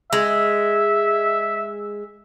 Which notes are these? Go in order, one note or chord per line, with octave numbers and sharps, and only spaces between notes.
G#3 E5